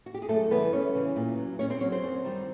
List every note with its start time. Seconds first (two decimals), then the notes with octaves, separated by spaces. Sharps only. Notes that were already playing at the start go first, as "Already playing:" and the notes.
0.06 F#4
0.14 G4
0.22 G#4
0.29 F#2 A3 A4
0.50 C#3 E3 G3 B3 B4
0.73 F#2 C#4 C#5
0.94 C#3 E3 G3
1.16 A#2
1.37 F#3
1.59 A#2 C#4 C#5
1.70 C4 C5
1.80 F#3 C#4 C#5
1.92 C4 C5
2.03 F#2
2.24 D#3 G3